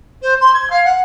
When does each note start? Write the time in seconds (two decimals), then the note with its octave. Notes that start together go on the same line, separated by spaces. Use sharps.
0.22 C5
0.40 C6
0.53 G#6
0.70 F5
0.84 F#5